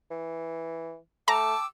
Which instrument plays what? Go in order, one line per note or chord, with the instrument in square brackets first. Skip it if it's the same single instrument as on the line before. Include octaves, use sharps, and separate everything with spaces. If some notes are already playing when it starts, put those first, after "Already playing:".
[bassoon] E3
[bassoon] A3 [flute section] G5 D6 E6 [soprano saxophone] A5 [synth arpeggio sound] A#5